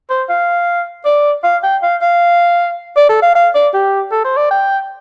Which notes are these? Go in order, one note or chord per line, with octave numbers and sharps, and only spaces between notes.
C5
F5
D5
F5
G5
F5
F5
D5
A4
F5
F5
D5
G4
A4
C5
D5
G5